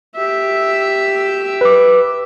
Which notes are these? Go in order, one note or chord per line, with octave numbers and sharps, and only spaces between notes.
G4 E5
B4 D6